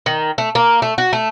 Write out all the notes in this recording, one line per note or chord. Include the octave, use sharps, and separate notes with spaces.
D#3
A3
A#3
A3
F#4
A3